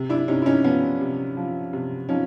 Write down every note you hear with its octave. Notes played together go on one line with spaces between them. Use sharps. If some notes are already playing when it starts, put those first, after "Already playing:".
Already playing: C3
D4 E4
C3 C#4 D#4
E4
C#4 D#4
F3 B3 C#4
C3
F3
C3
F3 C#4 D#4